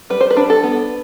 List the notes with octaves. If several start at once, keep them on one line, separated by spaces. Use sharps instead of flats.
G3 B4
C5
B4
D4
A4
B3